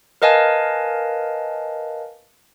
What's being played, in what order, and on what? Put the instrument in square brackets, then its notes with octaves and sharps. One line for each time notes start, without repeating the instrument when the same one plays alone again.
[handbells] A#4 B4 D#5 F5 G#5 A5